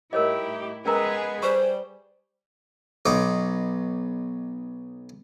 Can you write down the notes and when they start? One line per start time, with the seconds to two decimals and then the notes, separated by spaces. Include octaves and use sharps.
0.13 A2 G3 D#4 E4 G4 A#4 C#5 D#5
0.86 G#3 B3 C#4 G#4 A#4 B4 A#5
1.43 G3 C5 C#6
3.06 B1 D#4 D6